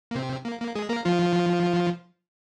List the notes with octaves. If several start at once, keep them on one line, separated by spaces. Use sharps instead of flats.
A#3
C3 C4
A#3
A#3
G#3 G#4
A#3 A#4
F3 F4